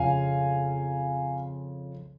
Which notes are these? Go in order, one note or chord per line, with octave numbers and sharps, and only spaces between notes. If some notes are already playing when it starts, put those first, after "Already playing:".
Already playing: F2 C#3 F3 F5 G#5